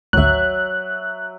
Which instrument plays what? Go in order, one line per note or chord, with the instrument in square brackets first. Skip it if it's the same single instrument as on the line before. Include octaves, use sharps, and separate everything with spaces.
[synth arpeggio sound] G#1 D2 [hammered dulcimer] F#3 E5 [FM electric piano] F#6